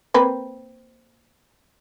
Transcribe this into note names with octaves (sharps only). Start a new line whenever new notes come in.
A#3 C4 B4